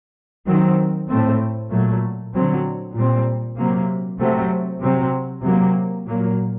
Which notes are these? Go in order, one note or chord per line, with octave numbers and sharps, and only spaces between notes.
D#3 F#3 C4
A2 A3 C4
A#2 F#3 A3
D3 F#3 C4
A#2 G3 C4
C3 F#3 A#3
C3 F#3 A3 C4
C3 F#3 C4
C3 F#3 A#3
A#2 F#3 A#3